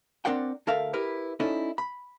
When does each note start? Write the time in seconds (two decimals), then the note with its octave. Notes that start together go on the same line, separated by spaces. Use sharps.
0.25 C4 D4 A#4 D5 F#5 G5
0.67 D2 A4 A#4 E5 F5
0.93 E4 G4 A#4 B4
1.40 C#4 D#4 E4 A4 D5 D#5
1.78 B5